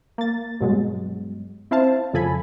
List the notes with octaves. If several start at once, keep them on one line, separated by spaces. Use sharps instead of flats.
A#3 A6
G2 B2 F#3 G#3
C4 E4 C5 F5 A5
F2 C#3 F3 A4 G#5 B5